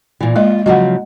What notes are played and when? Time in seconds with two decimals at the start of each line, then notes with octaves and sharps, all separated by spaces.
0.21 A#2 E3
0.36 G#3 A#3 F4 D#5
0.66 C#3 F3 F#3 D#5 F#5